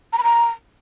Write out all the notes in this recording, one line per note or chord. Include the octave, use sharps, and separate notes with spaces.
A#5
B5
A#5